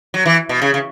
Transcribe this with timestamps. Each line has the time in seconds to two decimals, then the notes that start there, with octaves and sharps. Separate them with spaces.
0.14 F#3
0.26 E3
0.49 B2
0.62 C#3
0.74 C#3